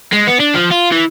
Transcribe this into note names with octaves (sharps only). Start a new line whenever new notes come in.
G#3
B3
D4
F3
F4
E3